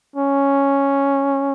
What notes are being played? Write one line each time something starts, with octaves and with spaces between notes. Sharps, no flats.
C#4